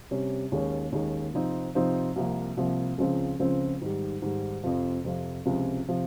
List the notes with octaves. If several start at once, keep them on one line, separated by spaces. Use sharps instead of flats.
C3 G3 C#4
D#2 D#3 G#3 C#4
D#2 D#3 G#3 C#4
C3 F3 C4 D#4
C3 F3 C4 D#4
C2 C3 F3 A#3
C2 C3 F3 A#3
C#2 C#3 F3 C4
C#2 C#3 F3 C4
G#2 D#3 G3
G#2 D#3 G3
F2 C3 F3
F2 C3 F3
C#2 C3 F3
C3 F3